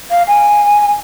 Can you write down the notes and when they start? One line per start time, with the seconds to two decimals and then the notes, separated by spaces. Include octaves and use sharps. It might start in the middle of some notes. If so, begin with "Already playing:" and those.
0.11 F5
0.28 G#5